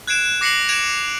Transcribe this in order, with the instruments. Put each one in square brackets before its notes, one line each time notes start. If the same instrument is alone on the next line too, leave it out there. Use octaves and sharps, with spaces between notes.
[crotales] F#6 G#6 C7 D7 E7
D6 A#6 C7 C#7 E7 F#7
G#6 D7 E7 F7